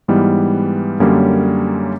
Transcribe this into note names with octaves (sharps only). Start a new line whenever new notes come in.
G#2 E3 G3 B3
F#2 D3 G3 A#3 C#4